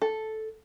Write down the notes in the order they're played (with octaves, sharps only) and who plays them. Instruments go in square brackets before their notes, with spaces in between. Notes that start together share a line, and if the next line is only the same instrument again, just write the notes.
[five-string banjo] A4